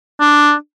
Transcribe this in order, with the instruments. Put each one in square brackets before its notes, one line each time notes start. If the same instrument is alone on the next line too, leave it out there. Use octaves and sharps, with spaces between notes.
[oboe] D4